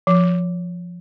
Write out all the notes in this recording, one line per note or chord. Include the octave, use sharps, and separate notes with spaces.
F3